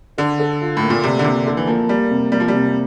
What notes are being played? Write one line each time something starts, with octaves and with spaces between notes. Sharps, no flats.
D3 A4
A4
F4
A2
A#3
A#2
C3 D5
D3
C3 A#3
D3 A4
E3
F3 A#3
G3 A#3
C3
G3 A#3
F3
C3 G3